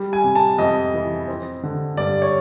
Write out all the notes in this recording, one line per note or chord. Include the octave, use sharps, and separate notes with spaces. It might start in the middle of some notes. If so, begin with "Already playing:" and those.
Already playing: G3
G#5
C3
A5
F2 D#5
E3
C4
D3
G2 D5
C#5